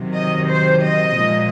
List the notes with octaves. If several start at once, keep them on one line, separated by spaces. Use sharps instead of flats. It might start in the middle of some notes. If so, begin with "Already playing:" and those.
Already playing: C3 D#3 F#3
D#5
C5
D#5
A#2 F3 G#3